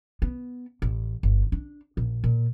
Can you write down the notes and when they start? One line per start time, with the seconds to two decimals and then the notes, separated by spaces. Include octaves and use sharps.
0.22 B3
0.82 A1
1.23 G1
1.52 D4
1.97 A#1
2.24 A#2